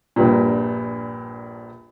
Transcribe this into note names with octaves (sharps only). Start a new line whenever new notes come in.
A#1 G2 A#2